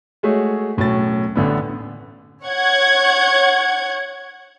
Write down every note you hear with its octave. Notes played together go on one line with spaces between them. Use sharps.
G#3 A3 F#4 G#4 C#5
E1 A2 F#3 C#4 A6
A1 D3 A3 B3
C#5 F#5 G#6